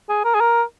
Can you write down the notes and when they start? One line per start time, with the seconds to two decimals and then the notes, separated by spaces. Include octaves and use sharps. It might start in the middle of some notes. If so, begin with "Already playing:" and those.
0.09 G#4
0.25 A#4
0.35 G#4
0.40 A#4